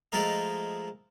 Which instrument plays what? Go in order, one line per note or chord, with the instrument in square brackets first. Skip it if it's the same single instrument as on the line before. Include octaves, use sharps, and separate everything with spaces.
[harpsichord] F3 G#3 A3 A4 A#4 D#5